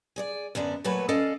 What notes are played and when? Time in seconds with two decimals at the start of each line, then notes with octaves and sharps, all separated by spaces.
0.16 G#4 C#5 D5
0.55 F#2 D3 B3 D4
0.84 A#2 F#3 A3 B3 B4 C#5
1.09 C#4 A4 D5 D#5 F5